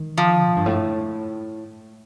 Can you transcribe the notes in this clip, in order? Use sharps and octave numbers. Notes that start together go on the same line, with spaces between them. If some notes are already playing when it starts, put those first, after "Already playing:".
Already playing: D#3
F3
A2
G2
A2